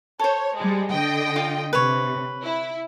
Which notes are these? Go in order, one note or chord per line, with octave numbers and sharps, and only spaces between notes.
A4 C5 C#5
G3 G#3
D3 D#5 G5
F4
C3 B4 C#5
E4